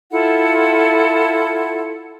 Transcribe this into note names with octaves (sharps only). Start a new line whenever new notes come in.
E4 F4 A4 F#5